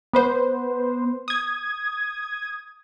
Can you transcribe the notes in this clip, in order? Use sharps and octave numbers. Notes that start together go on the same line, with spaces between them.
B3 B4 C5
D#6 G#6